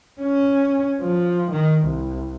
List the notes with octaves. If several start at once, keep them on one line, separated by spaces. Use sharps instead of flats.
C#4
F3
D#3
C2